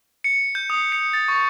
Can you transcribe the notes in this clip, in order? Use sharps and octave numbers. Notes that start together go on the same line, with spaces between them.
C#7
G6
D#6
C#7
A6
C#6